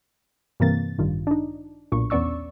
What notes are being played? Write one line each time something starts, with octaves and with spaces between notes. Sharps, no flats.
G2 C3 E3 A#3 C4 A6
A1 G2 D#3 F4
D4 D#4
B1 A#2 D4 C#6
E2 B3 C#4 D5 C#6 E6